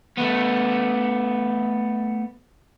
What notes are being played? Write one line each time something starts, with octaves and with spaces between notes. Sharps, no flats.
A3 B3